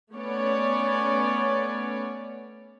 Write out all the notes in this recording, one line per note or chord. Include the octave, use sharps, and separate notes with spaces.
A3 B3 C#4 C#5 D5